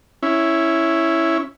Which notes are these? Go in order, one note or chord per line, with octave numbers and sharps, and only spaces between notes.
C#4 E4